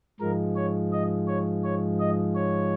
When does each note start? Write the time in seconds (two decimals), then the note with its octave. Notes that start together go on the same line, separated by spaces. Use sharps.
0.20 G#2 F3 G#3 A#4
0.56 C#5
0.92 D#5
1.27 C#5
1.64 C#5
2.00 D#5
2.35 C#5